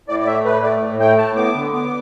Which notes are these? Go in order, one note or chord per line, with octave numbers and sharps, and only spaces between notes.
A2 D5
D5
A3 E5
A2 B4
A3 D5
A2
A3 G5
A2 A5
B3 D6
D3
B3 D6